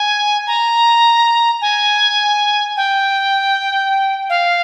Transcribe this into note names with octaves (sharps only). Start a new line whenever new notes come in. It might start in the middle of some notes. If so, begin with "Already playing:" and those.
Already playing: G#5
A#5
G#5
G5
F5